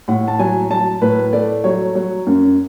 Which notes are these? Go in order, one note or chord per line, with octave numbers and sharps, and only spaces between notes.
A2 F#5
A5
F#3 G#5
F#3 A5
A2 B4
A3 D5
F#3 C#5
F#3
F#2